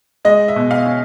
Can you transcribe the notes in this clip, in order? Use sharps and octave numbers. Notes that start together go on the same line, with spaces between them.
G#3 D#5
E5
B2
F5
C#4